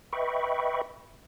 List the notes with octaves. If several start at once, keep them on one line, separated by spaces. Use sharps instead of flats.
B4 D#5 E5 G5 B5 C#6